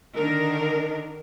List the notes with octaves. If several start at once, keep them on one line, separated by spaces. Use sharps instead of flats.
D3 D#3 D4 D#4 A#4